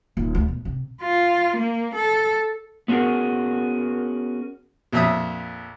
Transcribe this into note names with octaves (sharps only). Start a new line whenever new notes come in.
D#1
D2
B2
C3
F4
A#3
A4
B3 C#4 F#4 G#4 A#4
A#1 F2 E5 D#6